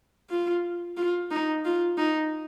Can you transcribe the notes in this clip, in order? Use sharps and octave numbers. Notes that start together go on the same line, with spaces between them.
F4
F4
D#4
F4
D#4